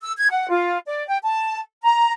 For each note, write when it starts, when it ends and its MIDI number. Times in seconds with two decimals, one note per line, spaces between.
0.02 0.13 88
0.17 0.30 92
0.30 0.49 78
0.50 0.78 65
0.87 1.05 74
1.07 1.18 79
1.24 1.59 81
1.83 2.12 82